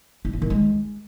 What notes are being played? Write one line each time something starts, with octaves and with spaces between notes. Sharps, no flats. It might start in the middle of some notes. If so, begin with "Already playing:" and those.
E4
E3
D#3
G#3